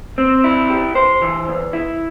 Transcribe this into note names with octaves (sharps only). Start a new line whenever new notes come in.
C4
E4
G4
C5
E3
E2
E4